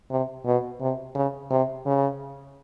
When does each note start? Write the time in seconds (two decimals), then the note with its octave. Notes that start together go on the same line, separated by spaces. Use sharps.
0.10 C3
0.45 B2
0.80 C3
1.15 C#3
1.50 C3
1.86 C#3